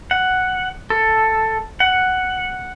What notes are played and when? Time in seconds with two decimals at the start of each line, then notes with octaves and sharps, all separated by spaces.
0.11 F#5
0.90 A4
1.80 F#5